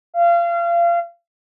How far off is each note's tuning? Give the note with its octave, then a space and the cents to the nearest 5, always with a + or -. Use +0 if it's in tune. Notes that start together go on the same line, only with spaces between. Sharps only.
F5 -30